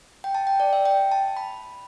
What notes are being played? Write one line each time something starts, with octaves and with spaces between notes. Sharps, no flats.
G5
A5
G5
D5
E5
G5
A5
B5